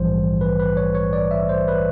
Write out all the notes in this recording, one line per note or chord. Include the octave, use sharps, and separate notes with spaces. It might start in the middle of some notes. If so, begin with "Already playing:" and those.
Already playing: A#1 G#2 E3 G3 C5
B4
B4
C#5
C#5
D5
E5
C5
B4